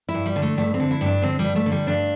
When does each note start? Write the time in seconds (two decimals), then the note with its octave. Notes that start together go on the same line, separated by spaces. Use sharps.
0.09 E4
0.14 G2
0.26 G3
0.36 D3
0.42 A3
0.57 G2 A3
0.74 C4
0.80 D3
0.91 E4
1.01 G2
1.06 D4
1.22 D3 C4
1.39 G3
1.45 G2
1.56 A3
1.66 D3
1.72 G3
1.87 G2 D4